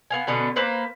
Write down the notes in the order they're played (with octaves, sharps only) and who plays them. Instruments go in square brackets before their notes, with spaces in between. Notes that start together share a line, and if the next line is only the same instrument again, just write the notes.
[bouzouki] B3 F5 G#5
B2 D3 B3 C#4
A#3 B4 C5 F5